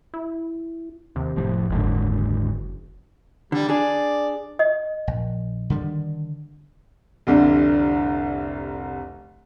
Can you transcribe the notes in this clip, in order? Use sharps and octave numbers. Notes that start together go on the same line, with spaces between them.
E4
D#2 C3
F1 A2 F3
F#1 D#2 G#2 D3
D3 G3
D4 G#4 D5
D#5
A#1
D3 D#3 G3
F1 C2 D3